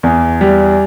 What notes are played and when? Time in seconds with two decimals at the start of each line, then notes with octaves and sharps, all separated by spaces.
0.03 E2
0.41 G3